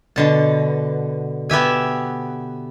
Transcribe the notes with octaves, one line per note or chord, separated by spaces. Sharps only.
B2 D3 A5
B3 G4 E5 G#5